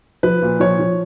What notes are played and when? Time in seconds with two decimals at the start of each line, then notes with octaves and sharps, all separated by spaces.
0.23 F3 B4
0.42 A#2
0.60 F3 C#5
0.79 F3